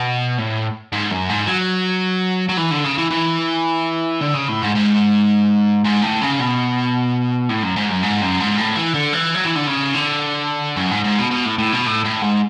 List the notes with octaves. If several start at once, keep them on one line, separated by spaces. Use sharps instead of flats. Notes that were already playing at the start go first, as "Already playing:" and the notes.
Already playing: B2
A2
G#2
F#2
G#2
F#3
F#3
E3
D3
C#3
E3
E3
D3
C#3
A2
G#2
G#2
G#2
A2
C#3
B2
A2
F#2
G#2
F#2
G#2
F#2
G#2
A2
E3
D3
E3
F#3
E3
D3
C#3
D3
F#2
G#2
G#2
B2
B2
A2
A2
B2
A2
A2
G#2